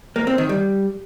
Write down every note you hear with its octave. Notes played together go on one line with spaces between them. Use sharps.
A#3
C4
D#3
G3